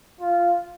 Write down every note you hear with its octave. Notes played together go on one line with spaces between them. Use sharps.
F4